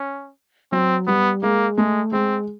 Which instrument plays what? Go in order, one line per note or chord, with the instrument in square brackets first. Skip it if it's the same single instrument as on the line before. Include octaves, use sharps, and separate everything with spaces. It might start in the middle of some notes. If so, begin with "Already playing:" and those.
Already playing: [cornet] C#4
[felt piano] F#3 [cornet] C4
[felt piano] G3 [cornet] B3
[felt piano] G#3 [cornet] A#3
[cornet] G#3 [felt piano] A3
[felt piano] G#3 [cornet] C4